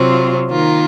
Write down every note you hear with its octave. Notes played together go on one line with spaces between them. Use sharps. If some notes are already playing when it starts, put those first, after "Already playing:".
Already playing: C3 F#3 C4 F4
D#3 A#3 F4